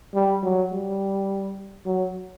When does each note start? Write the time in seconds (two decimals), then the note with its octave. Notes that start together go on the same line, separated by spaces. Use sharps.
0.14 G3
0.43 F#3
0.72 G3
1.86 F#3